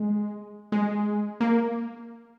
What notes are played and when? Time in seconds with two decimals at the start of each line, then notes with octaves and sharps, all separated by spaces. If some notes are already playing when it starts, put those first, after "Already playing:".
Already playing: G#3
0.72 G#3
1.41 A#3